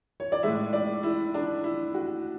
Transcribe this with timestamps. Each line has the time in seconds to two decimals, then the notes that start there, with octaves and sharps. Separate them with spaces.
0.20 C#5
0.32 D5
0.43 A2 G#3 E5
0.73 D5
1.03 E4
1.34 D4
1.64 E4
1.94 F#4